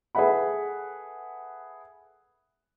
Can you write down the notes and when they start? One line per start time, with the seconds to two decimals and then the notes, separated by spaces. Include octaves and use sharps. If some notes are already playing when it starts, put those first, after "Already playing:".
0.15 G#4 A4 B4 E5 F#5 B5